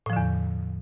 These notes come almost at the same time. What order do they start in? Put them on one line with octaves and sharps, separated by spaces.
A2 F3 D3 E2